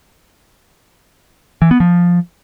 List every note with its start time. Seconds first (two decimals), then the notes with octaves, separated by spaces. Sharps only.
1.62 E3
1.71 B3
1.80 F3